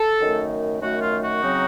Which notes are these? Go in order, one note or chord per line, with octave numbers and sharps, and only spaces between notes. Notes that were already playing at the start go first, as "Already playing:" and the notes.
Already playing: A4
F#2 D#3 A3
F#2 D#3 A3 F#4
F4
F#4
C#3 F#3 C4 D#4